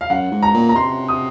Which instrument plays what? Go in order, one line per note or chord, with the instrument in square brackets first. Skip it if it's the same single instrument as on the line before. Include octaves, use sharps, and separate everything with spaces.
[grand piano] F5
[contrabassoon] F#2 [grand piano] F#5
[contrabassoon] G#2
[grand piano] A#5
[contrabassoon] A#2
[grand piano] A#5
[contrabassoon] C3 [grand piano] C6
[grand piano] D#6